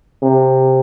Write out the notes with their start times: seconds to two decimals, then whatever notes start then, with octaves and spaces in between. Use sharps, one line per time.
0.23 C3